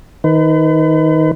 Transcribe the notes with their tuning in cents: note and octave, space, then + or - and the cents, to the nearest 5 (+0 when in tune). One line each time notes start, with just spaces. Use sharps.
D#3 +20 B4 +40